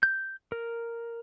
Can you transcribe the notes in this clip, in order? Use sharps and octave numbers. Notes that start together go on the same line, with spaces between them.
G6
A#4